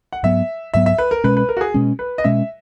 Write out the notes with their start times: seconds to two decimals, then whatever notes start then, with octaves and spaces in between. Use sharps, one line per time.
0.13 F#5
0.23 G#2 F#3 B3 E5
0.74 G#2 F#3 B3 E5
0.86 E5
0.98 B4
1.11 A#4
1.24 B2 G#3 C#4 B4
1.37 B4
1.49 A#4
1.57 F#4
1.61 G#4
1.74 B2 G#3 C#4
1.99 B4
2.18 D#5
2.24 B2 G#3 C#4 E5